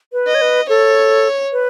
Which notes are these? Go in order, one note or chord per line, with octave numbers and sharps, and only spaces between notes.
B4
D#5
C#5
B4
A4 C#5
B4